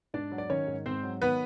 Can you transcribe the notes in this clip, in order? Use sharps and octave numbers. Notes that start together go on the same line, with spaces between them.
G#2 D4 D5
F#3
D5
D#3 C#4 C#5
G#2
G#2 C4 C5
F#3
D#3 B3 B4